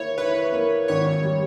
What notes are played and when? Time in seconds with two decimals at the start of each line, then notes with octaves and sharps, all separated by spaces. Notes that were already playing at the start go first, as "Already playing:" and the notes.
Already playing: A#3 E4 C#5
0.18 E4 B4
0.52 A#3
0.88 G#1 C#5
1.23 G3